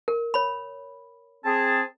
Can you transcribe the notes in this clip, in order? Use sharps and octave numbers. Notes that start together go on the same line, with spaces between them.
A#4
C#5 B5
C4 G#4 A5